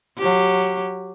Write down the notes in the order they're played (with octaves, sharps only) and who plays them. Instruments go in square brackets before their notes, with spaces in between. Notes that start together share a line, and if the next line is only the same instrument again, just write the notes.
[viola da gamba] F#3 G4